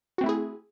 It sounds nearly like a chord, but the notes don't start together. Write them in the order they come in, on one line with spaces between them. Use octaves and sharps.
F#4 C4 A3 E4 G#4